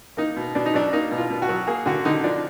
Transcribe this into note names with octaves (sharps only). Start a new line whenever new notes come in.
A#3 D#4
B2
B2 D4
D#4
F#3 D4
A#3 D#4
B2
F4
B2
F#4
F#3
A#3 G#4
D3 F#4
D3 D#4
F3 D4